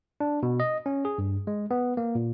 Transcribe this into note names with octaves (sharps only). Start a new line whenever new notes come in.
D4
B2
D#5
C#4
G#4
G2
G#3
B3
A#3
A#2